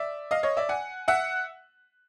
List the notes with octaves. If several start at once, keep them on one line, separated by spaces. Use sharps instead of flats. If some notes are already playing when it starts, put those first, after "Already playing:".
Already playing: D5 E5
D#5 F5
C#5 D#5
D5 E5
F#5 G#5
E5 F#5